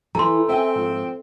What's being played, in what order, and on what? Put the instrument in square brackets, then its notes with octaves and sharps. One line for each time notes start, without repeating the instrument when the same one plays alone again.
[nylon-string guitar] E3 E4 [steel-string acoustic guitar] A3 [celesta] A#5 C6
[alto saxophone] C4 [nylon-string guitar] E5 G5 G#5
[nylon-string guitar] G#2 F3